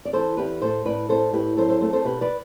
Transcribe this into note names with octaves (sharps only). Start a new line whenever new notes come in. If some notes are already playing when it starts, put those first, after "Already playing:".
D5
E3 A4 C5
E2 G4 B4
A2 A4 C5
A2 B4 D5
A2 A4 C5
A2 G4 B4
F#3 A4 C5
A4 C5
A3 A4 C5
A4 C5
B2 G4 B4
B4 D5